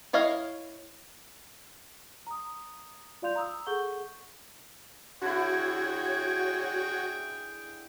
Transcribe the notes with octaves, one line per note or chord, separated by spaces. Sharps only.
E4 C#5 D#5 F5
A#5 D#6
F4 D5 F5 C6 G6 F7
A#5 D#6 E6
G#4 A4 F#5 C#6 G6 G7
D3 E4 F#4 G#4 C#5 G5 G#6